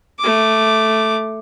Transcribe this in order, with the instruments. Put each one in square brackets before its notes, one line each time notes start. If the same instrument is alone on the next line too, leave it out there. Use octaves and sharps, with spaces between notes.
[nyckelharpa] A3 D6